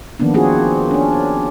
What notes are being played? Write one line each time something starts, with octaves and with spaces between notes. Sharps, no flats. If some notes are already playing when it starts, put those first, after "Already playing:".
D#3 F3 A#3 B3 D4
A#3 C4 D4 F4 F#4 G#4
C#4 D4